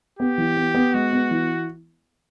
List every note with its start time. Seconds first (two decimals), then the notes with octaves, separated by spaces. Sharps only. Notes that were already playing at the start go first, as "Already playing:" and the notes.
0.19 B3 G4
0.38 E3
0.57 B3
0.75 B3
0.94 G#3 F#4
1.13 B3
1.31 E3